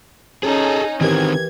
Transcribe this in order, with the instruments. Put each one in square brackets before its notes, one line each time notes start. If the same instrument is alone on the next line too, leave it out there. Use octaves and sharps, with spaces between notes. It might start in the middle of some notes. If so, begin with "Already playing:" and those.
[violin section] C#4 D#4 [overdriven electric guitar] G#4 A4
[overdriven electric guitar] D#3 C4 [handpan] E3 G4 A#4 [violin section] G#6